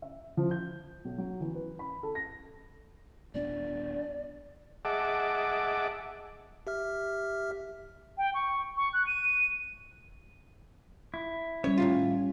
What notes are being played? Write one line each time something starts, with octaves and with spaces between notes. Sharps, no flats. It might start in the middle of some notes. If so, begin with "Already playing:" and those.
E5
F3
G6
B1
F#3
E3
B4
B5
A4
A#6
D#1 B3 D4 D5
G#4 D#5 E5 F#5 A5 D6
G4 E5 F6
G5
C#6
C#6
F#6
D#7
E4
G3 C#4 C#5
A2 D#3 F4